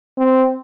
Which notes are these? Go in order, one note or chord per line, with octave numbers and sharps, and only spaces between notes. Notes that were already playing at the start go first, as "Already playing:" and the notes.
C4